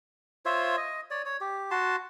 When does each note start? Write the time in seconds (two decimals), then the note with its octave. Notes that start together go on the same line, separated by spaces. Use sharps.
0.46 F4 C5 C#5 E5
0.77 D#5
1.11 C#5 D5
1.26 C#5
1.41 G4
1.71 F#4 A5 C6